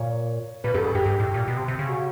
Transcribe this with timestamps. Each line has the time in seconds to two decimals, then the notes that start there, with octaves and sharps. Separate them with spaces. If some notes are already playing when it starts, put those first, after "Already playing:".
Already playing: A#2 C#5
0.64 A#2 B4
0.74 F#2 A4
0.84 G2 G#4
0.95 G2 G4
1.06 G2
1.20 A2
1.34 A#2
1.48 B2
1.57 C3
1.68 C3
1.79 C#3
1.89 F#4